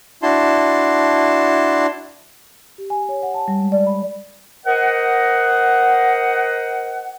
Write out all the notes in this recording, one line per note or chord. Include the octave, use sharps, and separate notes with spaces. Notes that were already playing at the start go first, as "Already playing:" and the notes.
D4 E4 F#4 A5 C6
G4
G#5
C#5
F#5
A5
G3
G#3
D5
B5
A#4 C5 D#5 F#5